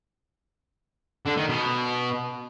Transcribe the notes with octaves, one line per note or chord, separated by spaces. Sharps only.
D3
D#3
B2